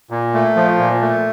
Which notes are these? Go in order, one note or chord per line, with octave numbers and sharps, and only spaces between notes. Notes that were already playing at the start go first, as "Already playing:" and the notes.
A#2
A3
F3
A#2
A3